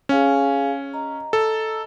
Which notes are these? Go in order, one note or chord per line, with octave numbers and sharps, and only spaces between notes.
C#4 G#4 F5 G#5
D#5 A#5
A4